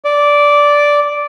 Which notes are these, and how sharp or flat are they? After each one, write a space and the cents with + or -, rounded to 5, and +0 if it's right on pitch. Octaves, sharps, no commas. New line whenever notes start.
D5 -10